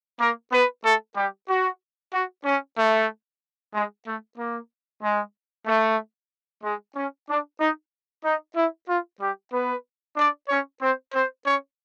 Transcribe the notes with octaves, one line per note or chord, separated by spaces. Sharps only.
A#3 A#4
B3 B4
A3 A4
G3 G4
F#4
F#4
C#4
A3
G#3
A3
A#3
G#3
A3
G#3
C#4
D4
D#4
D#4
E4
F4
G3 G4
B3 B4
D4 D5
C#4 C#5
C4 C5
C4 C5
C#4 C#5